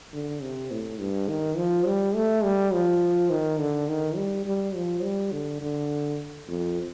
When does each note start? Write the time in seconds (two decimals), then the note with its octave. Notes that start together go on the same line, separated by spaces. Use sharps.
0.13 D3
0.42 C3
0.71 A2
1.00 G2
1.29 D#3
1.57 F3
1.86 G3
2.15 A3
2.44 G3
2.73 F3
3.30 D#3
3.59 D3
3.88 D#3
4.17 G3
4.46 G3
4.75 F3
5.03 G3
5.32 D3
5.61 D3
6.48 F2